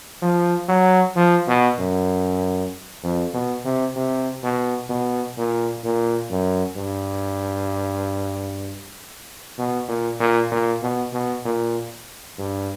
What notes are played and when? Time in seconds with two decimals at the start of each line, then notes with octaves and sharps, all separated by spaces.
0.22 F3
0.68 F#3
1.16 F3
1.47 B2
1.79 F#2
3.03 F2
3.34 B2
3.65 C3
3.96 C3
4.43 B2
4.89 B2
5.37 A#2
5.84 A#2
6.30 F#2
6.77 G2
9.58 B2
9.88 A#2
10.20 A#2
10.51 A#2
10.82 B2
11.13 B2
11.45 A#2
12.38 G2